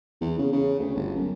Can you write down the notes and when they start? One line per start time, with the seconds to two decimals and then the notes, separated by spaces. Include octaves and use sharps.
0.21 E2
0.38 C#3
0.52 C#3
0.79 D2
0.95 G1
1.15 F#2